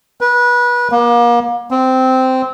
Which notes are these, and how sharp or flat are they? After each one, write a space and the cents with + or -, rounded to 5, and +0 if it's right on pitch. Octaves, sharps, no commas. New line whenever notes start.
B4 -25
A#3 +35
C4 -10